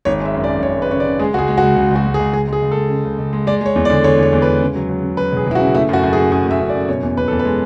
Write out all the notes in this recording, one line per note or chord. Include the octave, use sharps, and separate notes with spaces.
G#1 C#5
G#3
E5
F#2
D5
F#2
G#1 C#5
G#3
B4
C#3 C#5
D5
C#3
G#3 G#4
C#2 F#4 G#4
G#3
F#4
C#2
C#2
C#2
F#4
C#2
G#4
C#2
C#2 G#4
G#3 G#4
C#2
G#3 A4
C#3
C#2
C#2
G#3
G#3 D5
G#3 C#5
E2
D5
D3
D3 C#5
E2 C#5
E2
G#3 B4
C#3
F#3
F#3
C#3
F#3 B4
E1 G#4
E1 E4
F#4
C#3
A3 E4
F#2 F#4
F#2
G#4
F#2
F#2 G#4
A3 E5
F#2
D5
F#2
B2 C#5
E2
E2 B4
E2 A4
B4
G#3